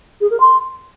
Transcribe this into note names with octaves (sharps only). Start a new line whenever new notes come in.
G#4
A#4
C6